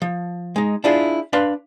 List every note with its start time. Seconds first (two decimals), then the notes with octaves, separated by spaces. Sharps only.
0.02 F3
0.56 G#3 D#4
0.84 D4 E4 F4 G#4
1.33 D4 B4 F5 C6